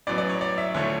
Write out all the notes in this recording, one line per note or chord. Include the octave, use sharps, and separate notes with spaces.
A1 A2 F#3 B3 D5
D5
C#5
D5
E5
D2 D3 F3 A3 C#5